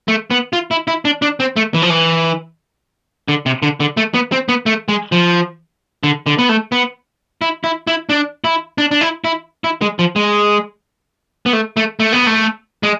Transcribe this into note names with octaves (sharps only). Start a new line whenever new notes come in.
A3
B3
F4
E4
E4
D4
D4
C4
A3
E3
F3
E3
D3
C3
D3
D3
A3
B3
C4
B3
A3
G#3
F3
D3
D3
B3
A3
B3
E4
E4
E4
D4
E4
D4
D4
E4
E4
E4
G#3
F3
G#3
B3
A3
A3
A3
B3
A3
G#3